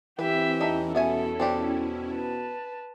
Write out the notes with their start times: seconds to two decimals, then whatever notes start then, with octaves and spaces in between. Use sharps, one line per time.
0.19 E3 C4 G4 B4 E5
0.61 E2 A3 C#4 D#4 E4
0.95 B2 B3 A4 E5 G#5
1.40 B2 C4 D4 G4
2.12 B4 A5